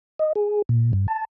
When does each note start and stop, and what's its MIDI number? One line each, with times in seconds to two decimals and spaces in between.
0.19 0.33 75
0.36 0.62 68
0.69 0.92 46
0.93 1.07 43
1.08 1.25 81